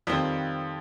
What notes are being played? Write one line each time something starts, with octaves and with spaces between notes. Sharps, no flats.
F2 D#3 G3 C4 F4